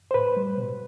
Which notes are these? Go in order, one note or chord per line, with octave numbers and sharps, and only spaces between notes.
C5
A2 B4
G3
B2